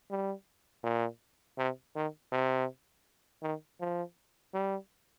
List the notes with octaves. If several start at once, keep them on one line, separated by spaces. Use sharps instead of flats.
G3
A#2
C3
D#3
C3
D#3
F3
G3